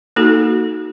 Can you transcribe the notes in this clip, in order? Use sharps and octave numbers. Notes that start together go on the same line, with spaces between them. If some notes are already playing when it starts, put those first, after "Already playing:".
A#3 D#4 F#4 A4